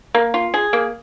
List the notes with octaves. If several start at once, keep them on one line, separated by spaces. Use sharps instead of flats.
A#3
F4
G#4
A#3